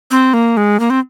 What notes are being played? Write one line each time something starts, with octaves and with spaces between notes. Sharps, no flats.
C4
A#3
G#3
A#3
C4